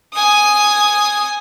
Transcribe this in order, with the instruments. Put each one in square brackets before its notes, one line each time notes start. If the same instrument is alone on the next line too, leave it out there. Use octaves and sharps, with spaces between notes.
[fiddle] G#5 D#6